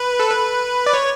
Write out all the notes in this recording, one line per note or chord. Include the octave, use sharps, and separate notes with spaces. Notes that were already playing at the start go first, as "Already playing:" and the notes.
Already playing: B4
A4
B4
D5
C#5